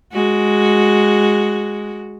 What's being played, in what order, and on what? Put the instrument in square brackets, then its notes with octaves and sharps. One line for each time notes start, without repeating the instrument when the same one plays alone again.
[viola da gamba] G#3 F#4